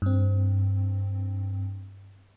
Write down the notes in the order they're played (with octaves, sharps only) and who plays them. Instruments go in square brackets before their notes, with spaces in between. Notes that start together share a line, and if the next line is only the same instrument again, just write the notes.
[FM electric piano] G2 C4